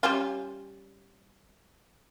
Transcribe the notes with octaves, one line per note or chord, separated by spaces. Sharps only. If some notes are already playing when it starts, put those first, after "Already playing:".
G3 C#4 F4